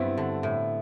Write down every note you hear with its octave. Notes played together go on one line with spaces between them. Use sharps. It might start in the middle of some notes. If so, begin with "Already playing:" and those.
Already playing: G2 B3 C4 E4
D3
A2